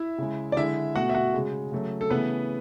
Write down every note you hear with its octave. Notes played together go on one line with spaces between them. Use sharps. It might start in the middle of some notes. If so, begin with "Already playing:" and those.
Already playing: E4 E5
C#3 G#3
D5
D3 G#3 E4 E5
B2 A3 F#4 F#5
E5
F#4 F#5
C#3 G#3
C#3 F#3 A3
A4
C#3 E3 A3 B3 B4